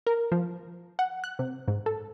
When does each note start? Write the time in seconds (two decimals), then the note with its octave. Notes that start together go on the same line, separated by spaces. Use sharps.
0.07 A#4
0.32 F3
0.99 F#5
1.24 F#6
1.39 C3
1.68 G#2
1.86 A4